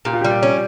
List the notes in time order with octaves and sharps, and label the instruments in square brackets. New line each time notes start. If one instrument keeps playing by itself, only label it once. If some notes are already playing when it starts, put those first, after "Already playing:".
[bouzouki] A#2 [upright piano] G4
[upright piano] F4
[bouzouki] G3 [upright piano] G4
[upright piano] F4
[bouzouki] C#4